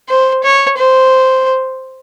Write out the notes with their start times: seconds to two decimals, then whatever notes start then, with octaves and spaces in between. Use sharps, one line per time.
0.09 C5
0.44 C#5
0.77 C5